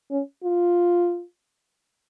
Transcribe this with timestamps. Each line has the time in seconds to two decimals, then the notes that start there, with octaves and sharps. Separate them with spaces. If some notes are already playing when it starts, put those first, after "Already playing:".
0.10 C#4
0.44 F4